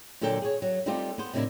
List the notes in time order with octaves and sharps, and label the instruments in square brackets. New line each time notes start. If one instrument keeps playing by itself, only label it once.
[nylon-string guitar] A#2 D3 F#3 A4 G5
G#4 C#5
F#3
G3 A3 C4 D#4 F4 G4
B3 C5
A2 C3 D#3 F3 D4 E4